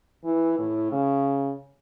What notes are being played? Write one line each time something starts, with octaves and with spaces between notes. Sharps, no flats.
E3
A2
C#3